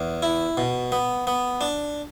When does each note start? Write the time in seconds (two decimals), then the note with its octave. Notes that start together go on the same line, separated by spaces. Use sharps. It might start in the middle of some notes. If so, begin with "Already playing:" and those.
Already playing: E2
0.22 E4
0.57 B2
0.92 B3
1.27 B3
1.61 D4